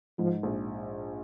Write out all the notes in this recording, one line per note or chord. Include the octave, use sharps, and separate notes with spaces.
G#2 F3
A#1